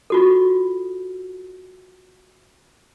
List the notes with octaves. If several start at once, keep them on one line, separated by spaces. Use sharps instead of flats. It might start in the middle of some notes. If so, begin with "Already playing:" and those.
F4 F#4 A4